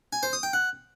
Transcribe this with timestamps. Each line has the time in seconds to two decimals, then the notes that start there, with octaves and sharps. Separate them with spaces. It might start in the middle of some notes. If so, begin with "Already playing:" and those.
0.13 G#5
0.23 C5
0.33 D#6
0.43 G5
0.53 F#5